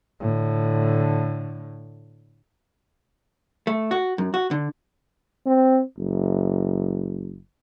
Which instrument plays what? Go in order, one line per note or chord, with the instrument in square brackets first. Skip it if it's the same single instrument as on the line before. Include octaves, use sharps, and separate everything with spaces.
[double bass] A2 D3
[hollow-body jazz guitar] A3
F#4
F#2
F#4
D3
[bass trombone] C4
F#1